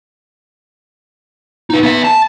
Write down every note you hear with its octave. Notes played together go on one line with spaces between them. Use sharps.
D#4 B4
B3 E5
A5